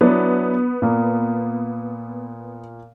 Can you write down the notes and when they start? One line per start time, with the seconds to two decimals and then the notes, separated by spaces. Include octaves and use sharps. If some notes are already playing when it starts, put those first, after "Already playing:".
0.01 F#3 B3 D4 E4
0.82 A#2 A#3